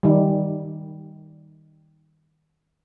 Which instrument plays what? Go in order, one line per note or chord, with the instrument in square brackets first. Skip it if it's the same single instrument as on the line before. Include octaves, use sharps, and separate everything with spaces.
[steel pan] D#3 G3